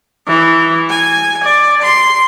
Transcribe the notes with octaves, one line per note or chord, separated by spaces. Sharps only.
E3
G#5
D5
C6